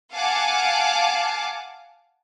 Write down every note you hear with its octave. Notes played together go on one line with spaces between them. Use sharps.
F5 F#5 G#5 A5 D6